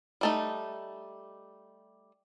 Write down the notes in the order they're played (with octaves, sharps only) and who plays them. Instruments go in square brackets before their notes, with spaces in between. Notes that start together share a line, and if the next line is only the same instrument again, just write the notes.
[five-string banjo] G3 A3 D#4